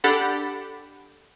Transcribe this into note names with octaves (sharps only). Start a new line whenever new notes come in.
D4 G4 A4 F#5 B5